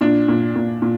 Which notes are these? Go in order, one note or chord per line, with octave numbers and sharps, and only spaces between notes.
A#2 D4
A#2
A#2
A#2